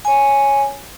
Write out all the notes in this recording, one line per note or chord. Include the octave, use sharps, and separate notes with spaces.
C#5 G#5